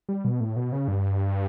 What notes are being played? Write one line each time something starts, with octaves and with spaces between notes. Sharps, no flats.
G3
B2
A2
B2
C#3
G2